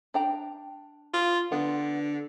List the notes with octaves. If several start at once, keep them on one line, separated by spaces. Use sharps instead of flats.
D4 G5 A#5
F4
D3 B3